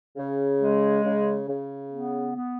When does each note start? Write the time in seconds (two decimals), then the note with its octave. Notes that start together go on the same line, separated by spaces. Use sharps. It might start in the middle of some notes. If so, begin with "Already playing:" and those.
0.17 C#3
0.60 G#3
1.04 C#3
1.49 C#3
1.92 B3
2.35 B3